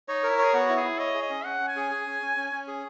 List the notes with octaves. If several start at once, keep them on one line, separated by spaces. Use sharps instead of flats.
D#4 C#5
A#4
E4
G#4 C#5
B3 F#4
E4
G#4
E4
C#5 D#5
G#4
D#5
C#4
C#4 F#5
C#4
G#5
G#4
G#4
C#4
C#4
C#4
C#4
G#4